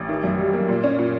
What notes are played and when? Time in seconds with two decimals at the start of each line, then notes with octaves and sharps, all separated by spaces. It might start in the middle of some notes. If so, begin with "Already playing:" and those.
Already playing: A1
0.09 D#3
0.24 F#2
0.38 G3
0.53 A#3
0.69 A#2
0.83 C#4
0.99 A#2